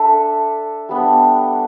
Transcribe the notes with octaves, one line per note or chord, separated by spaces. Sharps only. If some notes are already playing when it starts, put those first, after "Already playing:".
Already playing: D4 A4 E5
G3 B3 D4